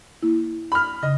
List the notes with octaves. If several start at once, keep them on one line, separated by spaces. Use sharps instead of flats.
A#3 E4
B5 F6
C#3 D#5